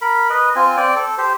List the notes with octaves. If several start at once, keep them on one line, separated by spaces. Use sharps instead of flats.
A#4 B5
B4 D#5
C4 F4 G#5
C4 D5 G5
A4
G4 C5